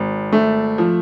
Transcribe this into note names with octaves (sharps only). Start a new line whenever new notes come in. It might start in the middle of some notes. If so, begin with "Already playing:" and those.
Already playing: G#1
A3
F3